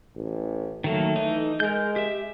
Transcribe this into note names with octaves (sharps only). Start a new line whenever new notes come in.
A1
D#3 F#3 A3 A#3
E3 D#4
G#3 A#4 G6
G4 E5